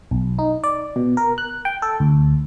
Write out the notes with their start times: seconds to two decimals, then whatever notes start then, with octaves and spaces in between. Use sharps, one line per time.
0.11 B1
0.39 D#4
0.64 D5
0.96 B2
1.17 A#4
1.38 F#6
1.65 G5
1.82 A4
2.00 D2